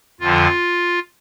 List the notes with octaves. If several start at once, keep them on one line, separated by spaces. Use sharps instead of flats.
F2 D3 F3 F4